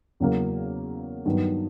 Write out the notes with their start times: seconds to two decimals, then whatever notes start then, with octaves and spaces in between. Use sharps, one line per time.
0.20 E2 C#3 F#3 A#3
1.25 G2 D#3 F#3 B3